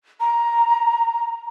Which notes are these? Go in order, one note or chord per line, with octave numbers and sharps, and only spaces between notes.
A#5